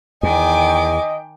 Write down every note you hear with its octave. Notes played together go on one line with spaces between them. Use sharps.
E2 D#3 D#5 G5 G#5 D6